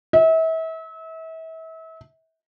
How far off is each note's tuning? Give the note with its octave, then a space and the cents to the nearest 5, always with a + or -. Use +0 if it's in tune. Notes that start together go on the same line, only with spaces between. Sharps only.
E5 -35